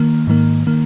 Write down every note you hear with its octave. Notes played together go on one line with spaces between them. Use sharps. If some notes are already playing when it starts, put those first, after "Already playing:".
Already playing: D#3 A#3
G#2 D#3 A#3
D#3 A#3